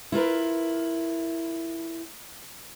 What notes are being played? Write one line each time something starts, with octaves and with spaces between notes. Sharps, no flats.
E4 F4 A#4 B4